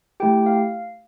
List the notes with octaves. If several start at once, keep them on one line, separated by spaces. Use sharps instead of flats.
A3 E4 G4 G5
F5